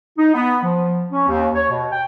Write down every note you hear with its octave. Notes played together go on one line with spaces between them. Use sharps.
D#4
B3
F3
C#4
D#2
C#5
B2
G5